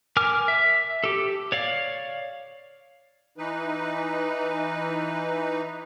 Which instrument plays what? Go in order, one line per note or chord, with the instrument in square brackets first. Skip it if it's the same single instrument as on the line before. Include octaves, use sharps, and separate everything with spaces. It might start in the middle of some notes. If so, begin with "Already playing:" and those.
[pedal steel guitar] A#4 G#5 D6 F6
E5
G4 A4
C#5 D5 F5
[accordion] E3 D#4 B4